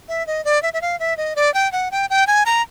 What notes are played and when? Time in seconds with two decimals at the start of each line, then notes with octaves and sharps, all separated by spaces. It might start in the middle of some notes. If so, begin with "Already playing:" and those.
0.09 E5
0.27 D#5
0.45 D5
0.63 E5
0.74 E5
0.82 F5
1.00 E5
1.17 D#5
1.36 D5
1.54 G5
1.72 F#5
1.92 G5
2.10 G5
2.27 G#5
2.46 A#5